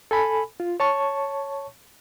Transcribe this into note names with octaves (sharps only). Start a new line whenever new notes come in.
A4 G#5 B5
F4
C#5 A5 C#6